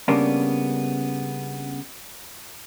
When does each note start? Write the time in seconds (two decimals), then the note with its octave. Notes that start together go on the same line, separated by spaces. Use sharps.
0.08 C#3 G3 A#3 B3 C#4 D4